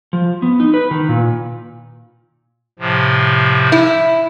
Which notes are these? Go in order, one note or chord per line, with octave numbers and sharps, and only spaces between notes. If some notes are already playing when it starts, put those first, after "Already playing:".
F3
B3
D#4
B4
D#3
A#2
A2 C3 F3
E4